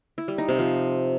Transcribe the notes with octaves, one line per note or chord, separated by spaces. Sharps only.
E4
G3
D#4
C3
F3